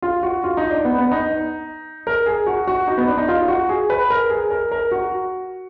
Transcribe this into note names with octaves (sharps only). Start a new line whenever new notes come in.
F4
F#4
F4
D#4
D4
B3
B3
D#4
A#4
G#4
F#4
F#4
D#4
B3
D4
D#4
F4
F#4
G#4
B4
A#4
G#4
A#4
A#4
F#4